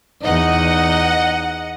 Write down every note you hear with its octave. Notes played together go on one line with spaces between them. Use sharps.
E2 D#4 D#5 F#5